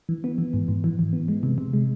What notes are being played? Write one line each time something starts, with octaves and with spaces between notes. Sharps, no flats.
E3
B3
E3
G#2
G#2
E3
E3
B3
G#3
C3
C3
G#3